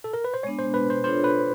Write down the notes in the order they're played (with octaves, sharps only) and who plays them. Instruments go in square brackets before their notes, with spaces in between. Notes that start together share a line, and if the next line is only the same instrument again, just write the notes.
[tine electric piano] A4
A#4
B4
C5
[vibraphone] G#3 B3 D4 [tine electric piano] C#5
[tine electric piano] C5
B4
C5
[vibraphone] D4 F4 A4 C#5 [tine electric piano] C5
[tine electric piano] B4